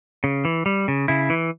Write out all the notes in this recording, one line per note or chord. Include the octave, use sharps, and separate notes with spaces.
C#3
E3
G3
C#3
C#3 E4
E3